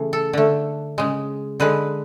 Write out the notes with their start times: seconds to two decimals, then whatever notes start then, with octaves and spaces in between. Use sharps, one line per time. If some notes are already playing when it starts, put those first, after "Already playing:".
Already playing: C#3 E3 A3
0.13 A4
0.33 D3 A3
0.98 C#3 G#3
1.60 D3 G#3 B4